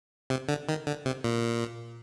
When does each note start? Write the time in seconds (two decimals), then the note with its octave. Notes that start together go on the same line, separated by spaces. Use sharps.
0.30 C3
0.49 D3
0.69 D#3
0.87 D3
1.05 C3
1.24 A#2